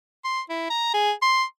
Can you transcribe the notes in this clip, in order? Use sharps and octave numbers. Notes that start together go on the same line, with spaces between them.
C6
E4
A#5
G#4
C6